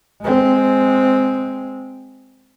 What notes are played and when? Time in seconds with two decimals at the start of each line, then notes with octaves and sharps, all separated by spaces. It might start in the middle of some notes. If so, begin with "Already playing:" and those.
0.21 G#3 C4